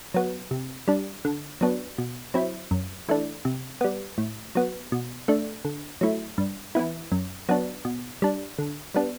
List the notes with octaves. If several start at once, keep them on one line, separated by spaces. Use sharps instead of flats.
F#3 B3
C3
G3 D4
D3
F#3 B3 D4
B2
F#3 C4 E4
F#2
E3 A3 D4
C3
G3 B3
A2
F#3 B3
B2
A3 D4
D3
F#3 A3 E4
G2
E3 B3 E4
F#2
F#3 B3 D4
B2
G3 D4
D3
G3 B3 D4